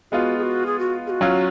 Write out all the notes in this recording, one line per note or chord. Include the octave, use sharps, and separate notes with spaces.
G#3 B3 F4 F#4
G#4
F#4
G#4
F#4
G#4
F#4
F#3 C#4 F4